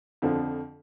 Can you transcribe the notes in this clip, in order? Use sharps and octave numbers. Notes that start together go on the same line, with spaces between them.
F2 D3 F3